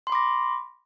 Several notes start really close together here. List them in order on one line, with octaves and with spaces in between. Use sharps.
C6 B5 D6 A#6